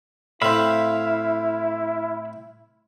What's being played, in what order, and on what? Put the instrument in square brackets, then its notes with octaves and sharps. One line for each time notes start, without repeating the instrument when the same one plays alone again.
[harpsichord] A2 C4 [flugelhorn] E4 [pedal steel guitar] E5 F5 B5